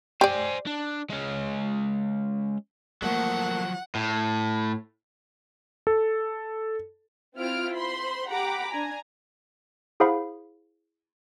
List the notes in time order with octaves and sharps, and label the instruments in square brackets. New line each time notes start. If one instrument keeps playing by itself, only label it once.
[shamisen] G4 D5 [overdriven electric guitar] C5 G#5
[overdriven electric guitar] D4
G#3 C#4
[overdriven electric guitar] F3 F#3 [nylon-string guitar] A3 A#3 [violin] F#5
[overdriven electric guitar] A2
[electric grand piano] A4
[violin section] C4 E4 F4 C5 F6 D7
C5 B5 C6
G4 F#5 A#5 B5 D6
D4 G#5 A#5
[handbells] E4 G#4 C5 F5 F#5 B5